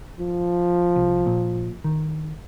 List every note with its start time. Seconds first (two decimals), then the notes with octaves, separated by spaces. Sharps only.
0.19 F3
0.96 C2
1.26 A#2
1.84 D#3